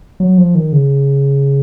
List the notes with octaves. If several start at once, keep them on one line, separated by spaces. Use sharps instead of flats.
F#3
F3
D#3
C#3